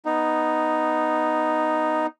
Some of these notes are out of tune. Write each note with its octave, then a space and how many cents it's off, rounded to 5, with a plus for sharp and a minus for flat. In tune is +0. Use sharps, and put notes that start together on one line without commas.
B3 +0 D#4 +0